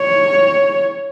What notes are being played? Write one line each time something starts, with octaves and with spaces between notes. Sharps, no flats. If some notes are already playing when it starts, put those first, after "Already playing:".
Already playing: C#5